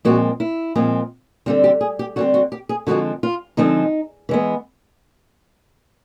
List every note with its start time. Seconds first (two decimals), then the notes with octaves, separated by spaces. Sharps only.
0.05 A#2 F3 G#3 C4 F#4
0.40 E4
0.75 A#2 F3 G#3 C4
1.46 D3 G3 C4 F4
1.64 G4
1.81 G#4
1.99 G4
2.16 D3 G3 C4 F#4
2.34 F#4
2.52 G4
2.69 G#4
2.87 D3 F3 G#3 C4 F#4
3.23 F4
3.57 D3 F3 G#3 C4 D#4
4.29 E3 G#3 B3